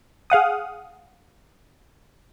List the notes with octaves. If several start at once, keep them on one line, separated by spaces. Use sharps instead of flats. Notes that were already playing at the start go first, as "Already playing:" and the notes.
G#4 F5 F#5 D#6